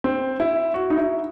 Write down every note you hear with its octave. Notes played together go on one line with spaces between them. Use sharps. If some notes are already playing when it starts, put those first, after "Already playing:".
C4
E4
F#4
D#4
E4